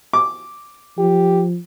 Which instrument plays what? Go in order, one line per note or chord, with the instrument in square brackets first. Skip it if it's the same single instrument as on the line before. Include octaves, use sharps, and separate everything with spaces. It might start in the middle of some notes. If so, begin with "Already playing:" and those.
[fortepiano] D6
[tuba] F3 [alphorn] G4